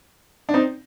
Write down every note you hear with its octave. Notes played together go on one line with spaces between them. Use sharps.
D4
C4 D#4